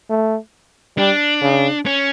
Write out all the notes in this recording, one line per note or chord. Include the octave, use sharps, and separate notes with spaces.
A3
G3 D4
C#3
C#4